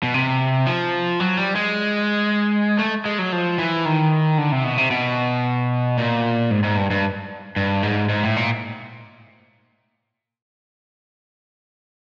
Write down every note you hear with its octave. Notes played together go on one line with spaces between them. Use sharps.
B2
C3
F3
F#3
G3
G#3
A3
G#3
F#3
F3
E3
D#3
D3
C3
B2
C3
B2
A#2
G#2
G#2
G2
G2
G2
G#2
G#2
A2
A#2